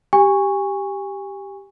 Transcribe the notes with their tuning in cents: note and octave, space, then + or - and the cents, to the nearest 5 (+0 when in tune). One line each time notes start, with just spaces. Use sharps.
G4 +0 G#5 -30 C#6 +0